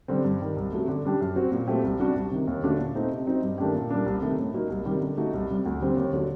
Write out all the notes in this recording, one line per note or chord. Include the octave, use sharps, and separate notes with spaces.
D3 G3 C4
G2
D#3 G3
C2
C3 F#3 A3
D3
G3 D4 G4
F#2
F#3 C4 F#4
A#2
F#3 A3 C4 G4
C2
C3 G3 D4 F#4
C2
C3 D#3
D#2
D3 A3 D4 F#4
A#2
A3 C4 D#4
C3
F#3 C4 D#4
G2
D#3 A3 D4 G4
A#2
G3 A#3 D4
C2
C3 D#3 A3
A2
F#3 A#3 D#4
C2
C3 D#3 G3
D3
A3 D#4 F#4
C2
C3 G3
D2
D3 G3 C4
D#2
D3 F#3